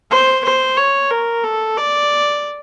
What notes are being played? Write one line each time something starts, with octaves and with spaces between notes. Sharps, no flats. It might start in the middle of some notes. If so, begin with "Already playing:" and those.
C5
C5
C#5
A#4
A4
D5